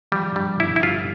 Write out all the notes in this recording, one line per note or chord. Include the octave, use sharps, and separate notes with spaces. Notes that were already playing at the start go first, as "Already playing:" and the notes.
F3 G3
G2 G3
G1 E4
E4
G3 F4